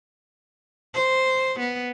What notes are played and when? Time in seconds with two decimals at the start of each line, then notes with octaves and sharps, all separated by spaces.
0.94 C5
1.59 B3